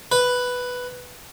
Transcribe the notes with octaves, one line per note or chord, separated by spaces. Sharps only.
B4